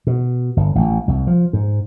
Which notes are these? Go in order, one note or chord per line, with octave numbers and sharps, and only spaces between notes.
B2
G1
A1
C2
F3
G#2